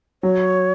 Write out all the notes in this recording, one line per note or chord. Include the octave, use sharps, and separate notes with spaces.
F#3 C#5